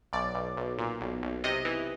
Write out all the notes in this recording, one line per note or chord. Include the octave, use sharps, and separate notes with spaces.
B1 D5
B1
B1
A#2
B1
B1
C3 D#5
E3